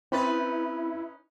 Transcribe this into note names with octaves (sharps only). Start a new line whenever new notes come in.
C4 C#4 D#4 E4 B4 B5 A6